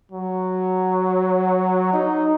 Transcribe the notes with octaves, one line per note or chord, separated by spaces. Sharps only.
F#3
D#4